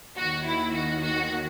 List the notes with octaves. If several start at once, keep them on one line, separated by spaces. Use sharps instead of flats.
D#2 D#3 F#4
E4
F#4
F#4